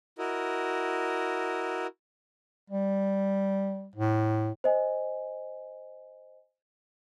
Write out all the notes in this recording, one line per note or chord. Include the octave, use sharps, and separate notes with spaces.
E4 F#4 A#4 D#5
G3
A2
C5 D#5 G#5